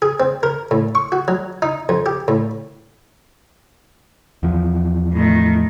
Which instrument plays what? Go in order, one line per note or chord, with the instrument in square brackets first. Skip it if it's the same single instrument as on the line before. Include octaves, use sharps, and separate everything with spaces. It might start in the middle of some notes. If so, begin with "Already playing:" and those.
[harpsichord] G#4
C4
A#4
A2
C#6
F#4
F#3
D#4
F2
G4
A2
[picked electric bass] E2 F3
[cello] A2 D#3